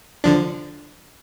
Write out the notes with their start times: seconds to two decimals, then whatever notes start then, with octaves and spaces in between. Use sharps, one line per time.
0.24 D3 F3 D4